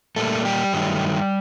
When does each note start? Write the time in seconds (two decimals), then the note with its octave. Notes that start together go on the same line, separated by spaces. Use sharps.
0.16 A#2 G3 A3 A#3 A4
0.45 G3 G4
0.73 G2 D#3 F#3 A3